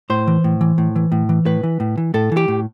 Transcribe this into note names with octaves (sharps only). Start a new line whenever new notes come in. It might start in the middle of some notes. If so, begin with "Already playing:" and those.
A2 C5
E3
A2
E3
A2
E3
A2
E3
A2 B4
E3
A2
E3
A2 A4
E3
G4
A2